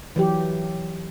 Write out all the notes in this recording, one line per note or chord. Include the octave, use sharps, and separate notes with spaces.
E3 F#3 G4